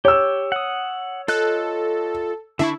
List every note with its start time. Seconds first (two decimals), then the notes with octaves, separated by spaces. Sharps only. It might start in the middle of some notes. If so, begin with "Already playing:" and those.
0.05 G4 C#5 E6
0.52 F#5 D#6
1.28 F4 A4 D#5 F#6
2.59 D3 D4 E4 C#6